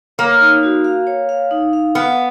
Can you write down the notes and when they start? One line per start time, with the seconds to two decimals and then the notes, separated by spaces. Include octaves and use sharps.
0.18 A#3 C#5
0.41 D#4
0.63 F#4
0.85 F5
1.07 C#5
1.29 F5
1.51 D#4
1.73 F5
1.95 B3 F5